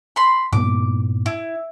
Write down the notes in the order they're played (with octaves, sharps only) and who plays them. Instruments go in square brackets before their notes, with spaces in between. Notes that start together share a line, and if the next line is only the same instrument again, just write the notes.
[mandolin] B5 C6
[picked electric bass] G2 A#2 B3 [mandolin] D6
[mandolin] E4